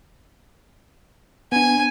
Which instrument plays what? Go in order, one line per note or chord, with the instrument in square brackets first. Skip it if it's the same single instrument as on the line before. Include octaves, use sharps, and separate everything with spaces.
[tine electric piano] B3 D4 [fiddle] G#5